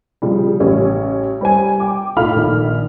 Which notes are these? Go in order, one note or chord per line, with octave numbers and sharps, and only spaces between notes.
C#3 F3 G3
A1 C#4
G3 C5 G#5
G5 D6
A2 D#4 F4 F5 B5 F6
A#1 D#3